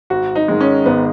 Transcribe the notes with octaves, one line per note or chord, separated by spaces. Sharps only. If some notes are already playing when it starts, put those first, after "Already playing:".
G#1 F#4
D#4
G#2 D#3 G#3
C#4
G#1 B3